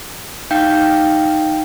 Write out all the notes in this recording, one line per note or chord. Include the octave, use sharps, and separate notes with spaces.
D#4 F5 G5 G6